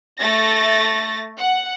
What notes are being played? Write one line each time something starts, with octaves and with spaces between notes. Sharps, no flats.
A3 A6 A#6
F#5